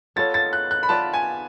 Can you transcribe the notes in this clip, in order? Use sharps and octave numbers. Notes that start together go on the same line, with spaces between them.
B3 F4 A4 C#5 A6
A6
F#6
F#6
B5
B3 F4 B4 D5 A5
G#5